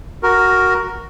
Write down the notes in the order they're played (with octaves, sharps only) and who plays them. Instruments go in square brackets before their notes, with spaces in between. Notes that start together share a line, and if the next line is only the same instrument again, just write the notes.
[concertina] F#4 A#4